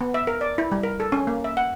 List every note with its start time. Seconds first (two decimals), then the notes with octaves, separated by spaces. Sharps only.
0.01 B3
0.14 E5
0.27 A#4
0.41 D5
0.58 E4
0.72 G3
0.83 A#4
1.00 A4
1.12 C#4
1.27 A#3
1.44 E5
1.57 F#5